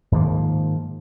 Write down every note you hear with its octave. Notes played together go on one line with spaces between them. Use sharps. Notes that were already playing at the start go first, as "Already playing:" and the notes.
G#2 D#3 F3 A#3